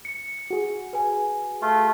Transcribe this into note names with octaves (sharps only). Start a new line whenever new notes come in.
C#7
F#4 G#4
B4 G#5
A3 F4